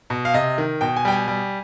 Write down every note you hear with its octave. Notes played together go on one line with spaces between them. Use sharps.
B2
F5
C3 D#5
D#3
B2 G5
G#5
G3 G5
G#5
G3